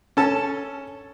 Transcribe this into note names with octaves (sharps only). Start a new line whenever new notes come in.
C#4 A4 A5